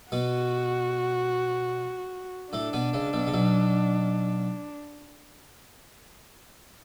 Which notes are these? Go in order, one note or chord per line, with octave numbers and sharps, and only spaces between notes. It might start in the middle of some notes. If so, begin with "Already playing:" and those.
B2 B3 F#4
A2 A3 D4
B2 B3
C#2 C#3
B1 B2
C#3
B1 B2